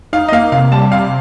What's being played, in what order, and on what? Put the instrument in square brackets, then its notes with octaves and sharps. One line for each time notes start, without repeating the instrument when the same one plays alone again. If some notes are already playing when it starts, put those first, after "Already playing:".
[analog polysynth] D#4 [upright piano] F5
[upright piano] D#5
[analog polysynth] A#3 [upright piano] F5
[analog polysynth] C3 [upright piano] F5
[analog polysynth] G3 [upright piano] A5
[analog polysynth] C3 [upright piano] F5